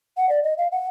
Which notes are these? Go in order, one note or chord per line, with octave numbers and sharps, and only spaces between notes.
F#5
D5
D#5
F5
F#5